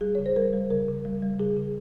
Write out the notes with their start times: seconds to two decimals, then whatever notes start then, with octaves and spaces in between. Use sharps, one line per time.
0.01 G3 G#4
0.15 C#3 C#5
0.26 C5
0.36 G3 A#4
0.53 G3
0.70 C#3 A#4
0.88 C#3
1.05 G3
1.23 G3
1.39 C#3 G#4
1.56 C#3